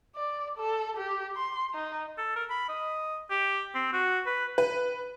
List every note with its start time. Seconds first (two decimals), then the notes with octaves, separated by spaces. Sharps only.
0.15 D5
0.57 A4
0.97 G4
1.36 C6
1.74 D#4
2.18 A4
2.36 A#4
2.50 B5
2.69 D#5
3.30 G4
3.75 C4
3.93 F#4
4.26 B4
4.58 B4